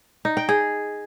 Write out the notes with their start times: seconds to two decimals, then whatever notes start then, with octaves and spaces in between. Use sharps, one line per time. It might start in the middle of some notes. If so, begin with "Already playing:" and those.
0.25 D#4
0.37 G5
0.49 G#4